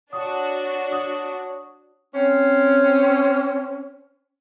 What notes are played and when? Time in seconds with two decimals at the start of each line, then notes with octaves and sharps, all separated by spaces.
0.13 D4 F#4 C#5 D#6
0.92 D#6
2.14 C4 C#4